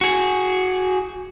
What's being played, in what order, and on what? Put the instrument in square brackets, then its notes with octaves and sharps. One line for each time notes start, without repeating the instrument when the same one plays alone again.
[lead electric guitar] F#4 G#4